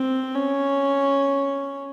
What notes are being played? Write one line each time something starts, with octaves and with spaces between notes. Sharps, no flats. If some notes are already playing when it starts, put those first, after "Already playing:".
Already playing: C4
C#4